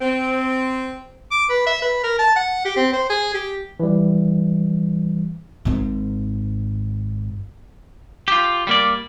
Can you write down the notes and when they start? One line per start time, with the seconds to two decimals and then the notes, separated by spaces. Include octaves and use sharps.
0.01 C4
1.31 D6
1.49 B4
1.67 E5
1.82 B4
2.04 A#4
2.19 A5
2.36 F#5
2.65 G4
2.77 C4
2.93 C5
3.10 G#4
3.34 G4
3.80 E3 G3
5.65 G#1 G#2
8.28 F4 G4
8.67 G3 A#3 D5